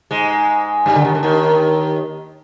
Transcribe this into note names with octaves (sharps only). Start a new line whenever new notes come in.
G#2 G#3
G2 G3
D3
D#2 D#3
D3
D#2 D#3